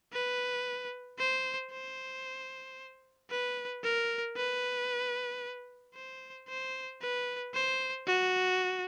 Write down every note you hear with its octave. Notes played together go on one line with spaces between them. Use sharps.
B4
C5
C5
B4
A#4
B4
C5
C5
B4
C5
F#4